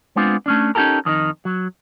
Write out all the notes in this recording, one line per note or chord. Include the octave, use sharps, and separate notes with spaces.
G#3 B3 C4 D4 F4
A3 C#4 D4
C#4 D#4 F4 G4 A4 A#4
F2 D#3 C#4 D#4
F#3